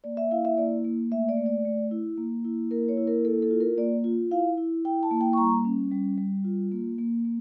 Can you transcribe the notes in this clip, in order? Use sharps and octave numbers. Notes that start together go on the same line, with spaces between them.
A#3 D5
E5
E4 F5
E5
A#3 D5
A#3
A3 E5
D5
A3
D5
A3
E4
A#3
E4
A#3 A#4
C#5
E4
A#4
A#3 A4
A4
F4
A#4
A#3 D5
F4
E4 F5
E4
E4 G5
A5
A#3
G5
C#6
G3 A#5
C#4
G3
G3
F4
A#3
A#3
A#3